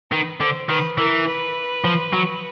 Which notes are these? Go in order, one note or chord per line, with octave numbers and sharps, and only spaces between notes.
D#3 B4
D3 C5
D#3 B4
E3 A#4
B4
F3
F#3